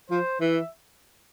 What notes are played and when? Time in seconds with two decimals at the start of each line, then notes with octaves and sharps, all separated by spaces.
0.10 F3 C5
0.41 E3 E5